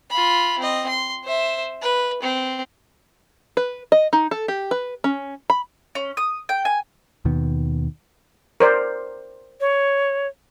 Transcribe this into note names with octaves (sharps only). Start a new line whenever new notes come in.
F4 B5
C4 D#5
C6
C5 E5
B4
C4
B4
D#5
D#4
A4
G4
B4
C#4
B5
C#4
D#6
G5
G#5
D#2 B2 D#3 B3
A#4 C5 D5
C#5